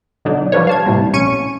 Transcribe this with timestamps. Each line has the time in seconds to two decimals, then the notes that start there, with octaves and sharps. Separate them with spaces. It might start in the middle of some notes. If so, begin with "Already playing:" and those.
0.25 B2 D3 F#3 D4 D#4
0.52 F3 G3 D4 B4 C#5
0.67 F5 A5 G#6
0.85 A2 C3 E3 G3 A#3 C4
1.13 A#1 C#4 C#6 C#7 D#7